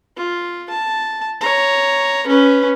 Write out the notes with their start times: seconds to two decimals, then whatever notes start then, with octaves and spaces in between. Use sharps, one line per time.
0.16 F4
0.69 A5
1.41 C#5 A#5
2.27 C#4 B4